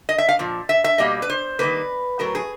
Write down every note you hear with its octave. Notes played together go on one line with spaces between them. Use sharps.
D#5
E5
F5
A#2 F3
E5
E5
B2 G3 A#3 D#5
B4
C5
D#3 G3 A#3 B4
A2 F#3 A3 A#4
G#4